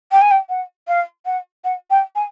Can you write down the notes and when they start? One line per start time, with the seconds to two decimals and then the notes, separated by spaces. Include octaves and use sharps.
0.12 G5
0.22 G#5
0.31 G5
0.49 F#5
0.88 F5
1.26 F#5
1.64 F#5
1.90 G5
2.16 G#5